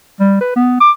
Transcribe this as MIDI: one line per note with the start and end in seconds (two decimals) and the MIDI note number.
0.20 0.37 55
0.41 0.51 71
0.56 0.80 59
0.80 0.91 86